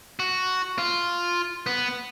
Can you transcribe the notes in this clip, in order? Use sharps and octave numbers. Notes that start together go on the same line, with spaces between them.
F#4
F4
B3